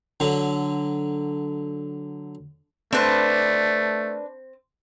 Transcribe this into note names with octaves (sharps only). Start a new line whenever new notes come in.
D3 F#3
A3 C4 D4 B4 C5